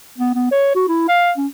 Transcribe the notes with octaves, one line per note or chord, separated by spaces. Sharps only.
B3
B3
C#5
F#4
E4
F5
C#4